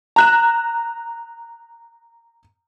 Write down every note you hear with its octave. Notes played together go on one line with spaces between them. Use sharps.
A#5 F#6 E7